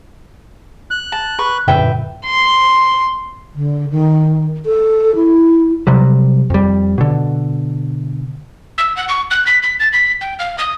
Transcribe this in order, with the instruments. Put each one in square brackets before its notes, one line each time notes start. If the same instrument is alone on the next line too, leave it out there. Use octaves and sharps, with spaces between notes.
[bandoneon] F#6
[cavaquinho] A5
B4 C#6
[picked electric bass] F#2 A#2 D3 [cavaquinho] B4 E5 G5
[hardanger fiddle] C6
[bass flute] D3
D#3
A4
E4
[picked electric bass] C3 F#3 G3
F2 G3
B2 D3
[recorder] E6
F#5
C#6
F#6
B6
B6
A6
B6
G5
F5
D#6